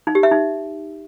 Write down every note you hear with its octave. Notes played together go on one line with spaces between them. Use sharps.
D#4
G4
E5
D#4